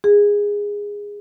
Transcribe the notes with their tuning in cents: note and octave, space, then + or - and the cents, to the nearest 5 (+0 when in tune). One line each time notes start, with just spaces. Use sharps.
G#4 -15